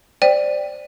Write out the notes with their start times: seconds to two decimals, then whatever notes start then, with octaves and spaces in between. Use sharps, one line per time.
0.22 C5 D5 G5